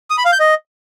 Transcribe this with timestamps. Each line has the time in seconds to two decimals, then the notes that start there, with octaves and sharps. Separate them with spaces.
0.10 D#6
0.18 B5
0.25 F5
0.32 G6
0.40 D#5